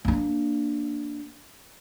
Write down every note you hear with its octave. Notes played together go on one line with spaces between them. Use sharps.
A#3 D4